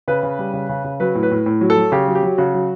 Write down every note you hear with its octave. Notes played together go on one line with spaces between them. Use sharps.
C#3 B4
C#3
G3
C#3
C#3
C#3
F#3 B4
A2
B4
A2
A2
F#3
A4
F#3
C#3 G4
F#3
G4
F#3
C#3 F#4
F#3